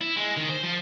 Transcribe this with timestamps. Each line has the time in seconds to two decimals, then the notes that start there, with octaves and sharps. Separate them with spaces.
0.01 E4
0.17 G#3
0.37 D#3
0.49 C5
0.63 F3